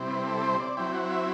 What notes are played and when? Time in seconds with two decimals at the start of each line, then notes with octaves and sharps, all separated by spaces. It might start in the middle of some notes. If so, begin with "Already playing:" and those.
Already playing: C3 G3 C4 E4
0.09 B4
0.26 A4
0.43 C5
0.60 D5
0.77 F#3 C4 E4 G5
0.94 F#5
1.11 E5